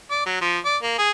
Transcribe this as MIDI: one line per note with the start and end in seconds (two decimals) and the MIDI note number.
0.11 0.22 74
0.26 0.38 54
0.41 0.59 53
0.65 0.77 74
0.83 0.98 58
0.98 1.11 68